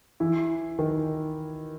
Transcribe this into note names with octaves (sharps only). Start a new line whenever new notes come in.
E3 E4
D#3 D#4